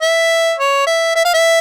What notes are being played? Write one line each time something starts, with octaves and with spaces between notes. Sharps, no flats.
E5
C#5
E5
E5
F5
E5